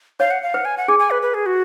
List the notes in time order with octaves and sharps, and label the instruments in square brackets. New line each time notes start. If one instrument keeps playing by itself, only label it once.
[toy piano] C#5 [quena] F5
[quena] F#5
F5
[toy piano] B4 [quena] F#5
[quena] G#5
F#5
[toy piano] G#4 [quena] G#5
[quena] G#5
B4
B4
G#4
F#4